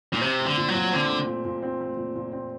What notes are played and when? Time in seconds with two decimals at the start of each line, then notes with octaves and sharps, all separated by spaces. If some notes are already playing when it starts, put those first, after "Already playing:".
0.13 A#2
0.21 C3 C4
0.40 A3
0.45 D3
0.57 A#2
0.68 F#3
0.74 A#2
0.92 D3 C4
1.10 A3
1.27 A#2
1.44 A#2
1.62 C4
1.81 A3
1.97 A#2
2.15 A#2
2.32 C4